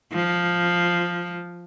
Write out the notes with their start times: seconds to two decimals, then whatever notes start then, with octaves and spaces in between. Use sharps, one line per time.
0.13 F3